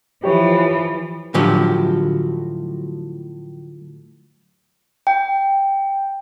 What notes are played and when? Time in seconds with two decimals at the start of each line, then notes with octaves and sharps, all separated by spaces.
0.24 E3 F3 G4 C#5
1.34 A2 D3 F3 F#3 G4
5.07 G5